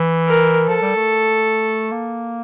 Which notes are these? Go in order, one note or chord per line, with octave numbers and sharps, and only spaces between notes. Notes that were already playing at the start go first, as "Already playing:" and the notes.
Already playing: E3
A#4
F3 A4
G3
A3
A#3